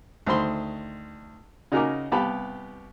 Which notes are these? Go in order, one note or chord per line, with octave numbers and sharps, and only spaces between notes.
D2 D#3 C5 B5 C6
C#3 D#4 F#4 A#4 G#5 D6
C2 B3 G4 F5 A5 B5